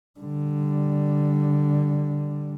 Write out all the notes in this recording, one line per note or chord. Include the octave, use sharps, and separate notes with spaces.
D3 G3